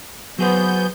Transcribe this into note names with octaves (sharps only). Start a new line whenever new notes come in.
F#3 B3 G#4 C5 G6